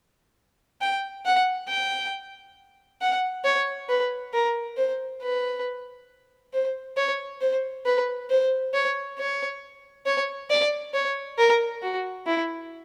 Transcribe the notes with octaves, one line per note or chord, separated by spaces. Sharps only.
G5
F#5
G5
F#5
C#5
B4
A#4
C5
B4
C5
C#5
C5
B4
C5
C#5
C#5
C#5
D5
C#5
A#4
F#4
E4